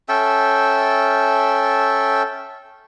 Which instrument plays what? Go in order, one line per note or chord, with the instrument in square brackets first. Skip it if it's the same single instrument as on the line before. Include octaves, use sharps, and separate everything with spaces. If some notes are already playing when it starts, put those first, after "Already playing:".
[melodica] C#4 A4 E5 G5